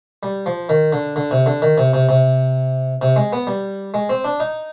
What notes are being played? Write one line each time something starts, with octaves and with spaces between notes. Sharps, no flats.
G3
F3
D#3
D3
D3
C3
D3
D#3
C3
C3
C3
C3
G#3
B3
G3
G#3
C4
D4
D#4